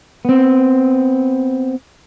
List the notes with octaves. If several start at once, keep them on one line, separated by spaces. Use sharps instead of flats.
B3 C4